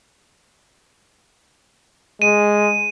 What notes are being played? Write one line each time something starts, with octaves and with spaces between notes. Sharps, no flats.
G#3 D#7